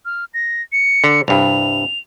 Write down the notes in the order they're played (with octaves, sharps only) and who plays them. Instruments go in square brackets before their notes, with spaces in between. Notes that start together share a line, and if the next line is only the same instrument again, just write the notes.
[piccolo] F6
A#6
C#7
[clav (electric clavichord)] D3
[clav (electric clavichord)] C2 G2 [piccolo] F7